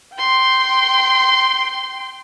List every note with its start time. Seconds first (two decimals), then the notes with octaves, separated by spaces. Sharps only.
0.14 G5 C6